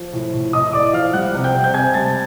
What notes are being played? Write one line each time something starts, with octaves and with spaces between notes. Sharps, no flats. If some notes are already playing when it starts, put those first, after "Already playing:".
Already playing: F3
A2
A2
A2 D#5 D#6
A2 D5 D6
F3 F5 F6
G3 F#5 F#6
C3
G5 G6
C3
G6
C3 G#5 G#6
G3 A5 A6